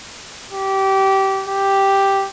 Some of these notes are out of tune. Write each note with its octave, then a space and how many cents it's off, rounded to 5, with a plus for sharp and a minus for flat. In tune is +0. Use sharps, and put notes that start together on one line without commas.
G4 -20
G4 +0